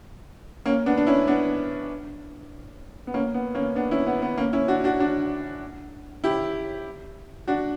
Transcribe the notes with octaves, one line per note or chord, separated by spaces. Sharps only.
A#3 C#4
B3 D4
D4
C#4 E4
B3 D4
B3
A#3 C#4
B3
A#3 C#4
B3 D4
C#4 E4
B3
B3
A#3 C#4
C#4 E4
D4 F#4
D4 F#4
D4 F#4
E4 G4
D4 F#4